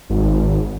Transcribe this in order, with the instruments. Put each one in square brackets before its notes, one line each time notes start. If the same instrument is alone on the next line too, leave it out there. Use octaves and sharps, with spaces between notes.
[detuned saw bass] G#1